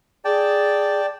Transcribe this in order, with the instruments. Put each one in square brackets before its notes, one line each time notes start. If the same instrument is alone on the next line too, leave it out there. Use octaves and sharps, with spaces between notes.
[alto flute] G#4 [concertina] D5 G5 A5